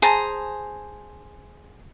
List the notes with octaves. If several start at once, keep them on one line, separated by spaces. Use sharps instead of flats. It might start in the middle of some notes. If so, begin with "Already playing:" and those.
G#4 C5 A5 A#5